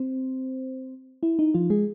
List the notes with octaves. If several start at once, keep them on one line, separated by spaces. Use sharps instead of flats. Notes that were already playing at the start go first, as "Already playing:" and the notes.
Already playing: C4 C5
E4
D#4
F3 F4
G#3 G#4